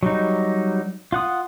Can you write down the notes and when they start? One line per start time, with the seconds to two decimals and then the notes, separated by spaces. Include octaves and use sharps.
0.03 F#3 G3 D#4
1.12 F4 F#5 D#6